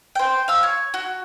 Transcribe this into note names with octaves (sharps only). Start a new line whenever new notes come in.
C5 G5
F5 E6
C#5
F#4